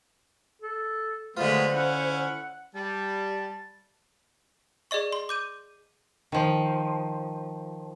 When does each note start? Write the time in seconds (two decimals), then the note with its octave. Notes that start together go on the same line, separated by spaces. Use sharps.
0.62 A4
1.37 D3 F#3 G#3 A3 B3 F4 C5
1.72 C#4 E4 F#5
2.75 G3 A5
4.91 G#4 D5 D#5 C#6
5.12 C6
5.29 D6 G6 D#7
6.32 D#3 F3